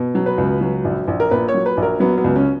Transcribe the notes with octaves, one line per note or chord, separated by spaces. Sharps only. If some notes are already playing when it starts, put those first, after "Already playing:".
Already playing: B2
F#3
B4
C#2
F#3
A#1
A#1
A#4
A#2 B4
C#5
F#3
B4
A#1
A#4
F#3 B3
B3
C#2
C#4